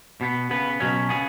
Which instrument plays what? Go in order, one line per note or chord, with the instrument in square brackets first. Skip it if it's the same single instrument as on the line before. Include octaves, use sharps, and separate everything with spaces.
[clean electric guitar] B2 B3
C#3 B3 B4
B2 F#3 C#4
C#3 B3 G#4